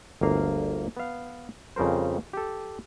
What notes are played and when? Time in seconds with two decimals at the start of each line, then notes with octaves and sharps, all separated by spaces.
0.21 G1 D2 A#3 F5
0.97 B3 F5
1.76 F2 C#3 G3 A#4 C5
2.33 G4 A4